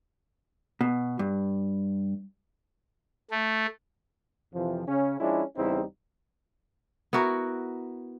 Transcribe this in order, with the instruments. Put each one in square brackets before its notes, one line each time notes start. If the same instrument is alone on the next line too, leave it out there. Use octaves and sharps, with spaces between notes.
[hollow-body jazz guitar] B2
G2
[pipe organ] A3
[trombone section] F2 C3 E3 F3
C#3 C#4
F3 G#3 C#4 D4 E4
E2 C#3 G3 C4 D#4 E4
[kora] B3 E4 F#4 A#4